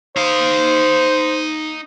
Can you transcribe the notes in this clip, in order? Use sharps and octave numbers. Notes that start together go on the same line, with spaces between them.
D#4 C5 F5